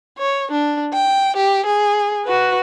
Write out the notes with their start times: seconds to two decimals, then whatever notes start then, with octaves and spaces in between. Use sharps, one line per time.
0.19 C#5
0.52 D4
0.93 G5
1.37 G4
1.66 G#4
2.25 F#4 B4